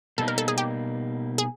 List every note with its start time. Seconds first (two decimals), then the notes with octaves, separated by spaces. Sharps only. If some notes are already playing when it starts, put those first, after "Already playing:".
0.18 B2 G3 A#3 D#4 A4
0.28 A#4
0.38 A4
0.48 G#4
0.58 G4
1.38 G#4